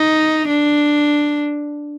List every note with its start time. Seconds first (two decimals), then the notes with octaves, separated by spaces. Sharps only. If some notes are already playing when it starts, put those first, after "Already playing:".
Already playing: D#4
0.49 D4